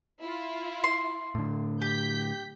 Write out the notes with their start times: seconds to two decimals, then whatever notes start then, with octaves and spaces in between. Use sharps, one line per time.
0.20 E4 F4
0.84 C6
1.35 A2 D3
1.82 G4 G6 B6